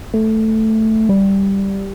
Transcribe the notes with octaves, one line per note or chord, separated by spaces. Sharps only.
A3
G3